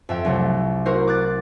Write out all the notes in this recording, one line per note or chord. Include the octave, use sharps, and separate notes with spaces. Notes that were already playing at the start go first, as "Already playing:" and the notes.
F2 E5 G5
C2 F#3 A3
E4 F#4 A#4 C5
D6 F#6 A6